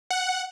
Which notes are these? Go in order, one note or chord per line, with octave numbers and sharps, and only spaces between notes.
F#5